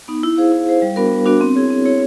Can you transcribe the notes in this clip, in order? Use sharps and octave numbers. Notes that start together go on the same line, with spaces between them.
B3 D#4
E4
G#4 C5 F5
E4
G#4 C5 F5
G3
B3 D4 F#4 A#4
G3
B3 D4 F#4 A#4
C4
E4 G#4 C#5
C4
E4 G#4 C#5